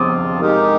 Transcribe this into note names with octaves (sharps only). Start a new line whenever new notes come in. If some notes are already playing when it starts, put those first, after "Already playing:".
Already playing: F3 C4 F4 D6 D#6
G#3 D#4 G4 A#4